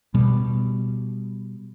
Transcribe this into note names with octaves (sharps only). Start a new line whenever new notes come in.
B2 G3